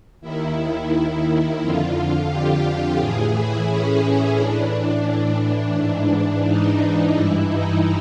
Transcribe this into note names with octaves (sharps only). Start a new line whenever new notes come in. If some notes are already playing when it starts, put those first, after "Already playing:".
D#2 D#3 E4
F2 D3 F4
F4
G4
A2 E3 G#4
E4
C#4
A2 E3 D4
G#2 E3
D#4
G2 E3 E4
D#4